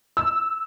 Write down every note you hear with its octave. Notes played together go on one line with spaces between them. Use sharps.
E6